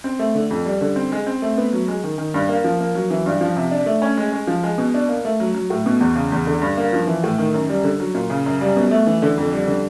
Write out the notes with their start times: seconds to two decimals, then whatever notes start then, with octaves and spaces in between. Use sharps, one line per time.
0.04 C4
0.19 A3
0.35 D3
0.51 F2
0.66 G3
0.81 D3
0.96 C4
1.12 G#3
1.27 C4
1.42 A3
1.57 B3
1.73 F#3
1.88 G#3
2.04 D#3
2.18 D#3
2.34 G2
2.49 A#3
2.64 F3
2.80 A#3
2.95 F#3
3.10 E3
3.26 G2
3.41 F3
3.57 C3
3.71 D4
3.86 A3
4.02 C#4
4.17 G#3
4.32 G#3
4.47 F3
4.63 G#3
4.78 B2
4.94 D4
5.09 A#3
5.25 A3
5.40 F#3
5.54 F#3
5.70 A2
5.86 B2
6.01 E2
6.16 C#3
6.32 E2
6.47 D3
6.62 G2
6.77 A#3
6.93 F3
7.07 E3
7.24 A2
7.38 D#3
7.54 F#2
7.69 G3
7.84 D3
8.00 F#3
8.15 A#2
8.30 C#3
8.46 F#2
8.61 G3
8.76 B2
8.91 A3
9.07 E3
9.22 D3
9.38 F2
9.53 G3
9.68 D3